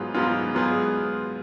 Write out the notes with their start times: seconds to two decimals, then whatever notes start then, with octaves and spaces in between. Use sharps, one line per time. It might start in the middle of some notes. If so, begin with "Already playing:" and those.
Already playing: G#2 F#3 B3 F4 G#4
0.14 G#2 F#3 B3 F4 G#4
0.54 G#2 F#3 B3 F4 G#4